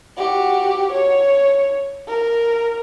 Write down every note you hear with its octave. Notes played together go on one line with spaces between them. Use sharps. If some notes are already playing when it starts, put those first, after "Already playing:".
F#4 G4
C#5
A#4